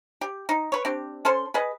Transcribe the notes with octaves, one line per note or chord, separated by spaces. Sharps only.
G4
D#4
B4 C#5
C4 D4 G4
C#4 A4 C5 C6
G#4 B4 D#5